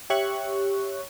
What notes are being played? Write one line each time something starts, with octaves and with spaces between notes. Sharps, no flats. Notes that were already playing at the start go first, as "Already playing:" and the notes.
G4 C#5 E5 C#6 F#6